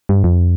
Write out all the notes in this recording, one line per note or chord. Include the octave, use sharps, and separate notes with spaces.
G2
F2